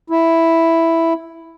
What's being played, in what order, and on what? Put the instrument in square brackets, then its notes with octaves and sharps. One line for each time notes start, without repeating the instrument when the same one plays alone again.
[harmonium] E4